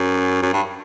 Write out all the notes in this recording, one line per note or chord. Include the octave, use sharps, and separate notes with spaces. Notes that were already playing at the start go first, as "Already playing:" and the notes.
Already playing: F#2
F#2
G2